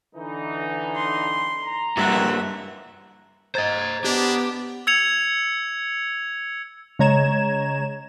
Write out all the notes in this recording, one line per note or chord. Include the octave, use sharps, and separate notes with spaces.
D3 E3 D#4
C6
A#5
G2 A#3 E5 F#5
C5 D#5 A#5 G#6 A6
B3 D4 G4
E6 G#6 C#7 F7
C#3 G#3 C#5 A#5 G#6 E7